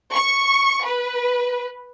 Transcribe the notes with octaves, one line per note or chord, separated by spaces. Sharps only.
C#6
B4